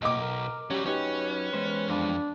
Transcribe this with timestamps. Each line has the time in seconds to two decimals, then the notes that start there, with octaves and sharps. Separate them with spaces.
0.02 B1 A#3 D#5 D6
0.20 A#4
0.70 F#3 G3 C#4 G4
0.86 F#2 F#3 C#4 D#4 G4 B4
1.53 E2 G#3 C5
1.88 F2 D4